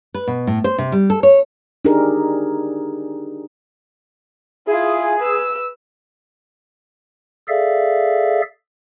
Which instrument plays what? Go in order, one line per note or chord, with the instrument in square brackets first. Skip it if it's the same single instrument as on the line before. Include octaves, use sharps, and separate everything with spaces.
[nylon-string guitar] B4
B2
A2
C5
C3
G3
A4
C#5
[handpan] D4 D#4 G4 G#4 A#4
[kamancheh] E4 F4 [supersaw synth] G#4
[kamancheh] B4 E6
[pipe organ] G#4 A4 D5 E5 F5